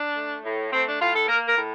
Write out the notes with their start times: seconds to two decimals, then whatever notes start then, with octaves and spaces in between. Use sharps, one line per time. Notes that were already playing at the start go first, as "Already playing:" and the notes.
Already playing: D4
0.16 A3
0.44 A2
0.72 A3 C4
0.87 D4
1.01 A2 F4
1.14 A4
1.28 A#3 A#4
1.48 A#4
1.57 A2